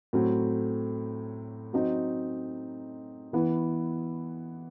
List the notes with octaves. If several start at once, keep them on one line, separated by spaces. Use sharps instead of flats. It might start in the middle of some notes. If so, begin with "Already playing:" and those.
A2 F#3 C4
F#3 C4 D#4
E3 B3 E4